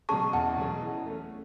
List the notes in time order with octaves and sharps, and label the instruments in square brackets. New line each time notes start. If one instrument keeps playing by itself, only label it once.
[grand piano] B2 F#3 C#4 G#4 [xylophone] A5 C#6
[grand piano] E2 [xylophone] F#5 A5
[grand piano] B2 F#3 C#4 G#4
E3
A3 C#4